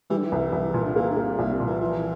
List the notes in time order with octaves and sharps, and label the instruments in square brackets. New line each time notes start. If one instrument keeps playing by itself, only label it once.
[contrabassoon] E3 [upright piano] G3
[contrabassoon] D3
E3
[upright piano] C2
C2
A#2
[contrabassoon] D3
[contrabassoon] E3 [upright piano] A#3
[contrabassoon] D3
[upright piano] A#3
[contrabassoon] C3
[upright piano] C2 [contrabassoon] A#2
[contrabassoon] C3
[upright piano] A#2
[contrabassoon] E3
[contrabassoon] E3 [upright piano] F3